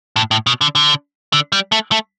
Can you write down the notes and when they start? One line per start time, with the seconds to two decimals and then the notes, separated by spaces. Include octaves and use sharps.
0.16 A2
0.31 A2
0.47 B2
0.61 D3
0.75 D3
1.33 D3
1.52 G3
1.72 A3
1.92 A3